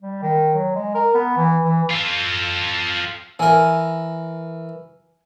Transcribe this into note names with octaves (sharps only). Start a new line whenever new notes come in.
G3
D#3
F#3
G#3
A#4
B3
E3
E3
F4 A4
E3 A#4 G#5